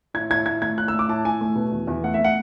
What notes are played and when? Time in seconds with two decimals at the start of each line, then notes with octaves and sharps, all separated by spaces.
0.14 A2 G#6
0.30 A2 G#6
0.46 A2 G#6
0.62 A3 G#6
0.78 A2 F#6
0.88 E6
0.94 A3
0.99 D6
1.08 A2 A5
1.24 A2 G#5
1.41 A3
1.56 B2
1.72 E2
1.87 E2
2.04 A3 F#5
2.14 E5
2.20 A3 F#5